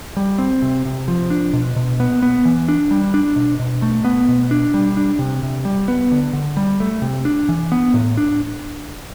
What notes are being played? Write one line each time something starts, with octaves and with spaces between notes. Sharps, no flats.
G3
C4
C3
C3
F3
D4
B2
B2
B3
B3
E3
D4
G3
D4
B2
B2
A3
B3
B2
D4
G3
D4
C3
C3
G3
B3
D3
D3
G3
A3
C3
D4
E3
B3
A2
D4